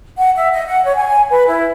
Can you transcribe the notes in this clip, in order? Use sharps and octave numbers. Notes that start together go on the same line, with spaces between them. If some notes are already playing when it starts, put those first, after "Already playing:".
F#5
E5
D#5
F#5
C#5
G#5
B4
E4